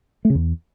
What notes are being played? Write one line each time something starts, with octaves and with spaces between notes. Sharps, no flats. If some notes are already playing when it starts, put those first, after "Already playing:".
A3
C#3
E2